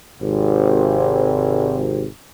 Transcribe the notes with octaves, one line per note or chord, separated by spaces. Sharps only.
G#1 C3